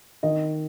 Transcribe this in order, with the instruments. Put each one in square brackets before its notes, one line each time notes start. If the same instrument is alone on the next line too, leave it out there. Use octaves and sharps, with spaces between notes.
[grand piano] D#3 D#5